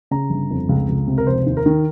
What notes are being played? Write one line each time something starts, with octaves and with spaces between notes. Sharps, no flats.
C#3 A#5
G1
F2
C#2
C#2
C3
A#4
F1 C5
D#2
A#4
D#3